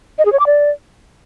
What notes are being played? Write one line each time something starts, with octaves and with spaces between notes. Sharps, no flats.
D#5
G#4
C#5
D6
D5